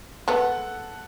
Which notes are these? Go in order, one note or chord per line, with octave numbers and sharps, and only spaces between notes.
G#3 A3 B3 A4 F#5